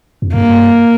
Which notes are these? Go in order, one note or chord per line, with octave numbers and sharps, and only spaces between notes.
F2
G2 A#3